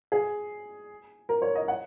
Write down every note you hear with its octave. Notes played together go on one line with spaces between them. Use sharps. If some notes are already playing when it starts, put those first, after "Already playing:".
G#4
A#4
C#5
D#5
F#5